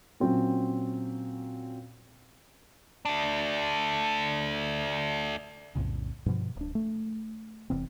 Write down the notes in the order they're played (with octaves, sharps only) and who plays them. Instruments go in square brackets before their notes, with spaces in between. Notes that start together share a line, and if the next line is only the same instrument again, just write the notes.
[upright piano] A#2 F#3 C4 C#4
[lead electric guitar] A3 D4
[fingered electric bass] B1 F2 A2 C#3
G2 B2 F3
D1 D4
A3
E1 E2 C3 C4